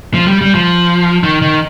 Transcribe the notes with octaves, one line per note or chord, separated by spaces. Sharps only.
F3
G3
G3
F3
D#3
D#3